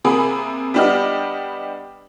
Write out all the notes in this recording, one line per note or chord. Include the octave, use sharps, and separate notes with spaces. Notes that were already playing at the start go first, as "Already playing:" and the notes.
C3 A#3 G#4 B5 D#6
G3 B3 D4 G4 D#5 F6